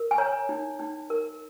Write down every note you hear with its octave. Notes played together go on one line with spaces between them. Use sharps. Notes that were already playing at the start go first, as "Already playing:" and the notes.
Already playing: A#4
G#5
C#5 A#5
D#4
D#4
A#4